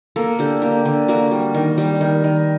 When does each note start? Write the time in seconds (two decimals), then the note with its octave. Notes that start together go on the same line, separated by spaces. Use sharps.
0.16 A#3 A4
0.39 D3 G4
0.62 A#3 G4
0.85 D3
1.08 A#3 F#4
1.32 G3
1.54 D#3
1.78 G3
2.01 D#3
2.24 D#3